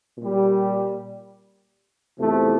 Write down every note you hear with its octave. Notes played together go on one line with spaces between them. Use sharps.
A#2 G3
E2 C3 F3 A3